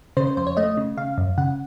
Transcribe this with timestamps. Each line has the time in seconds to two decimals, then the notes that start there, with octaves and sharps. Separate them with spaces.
0.17 C#3 C5
0.27 C5
0.37 F2 C5
0.47 C#5
0.57 A3 D#5
0.77 C#3
0.97 C#3 F5
1.18 F#2
1.38 C#3 F#5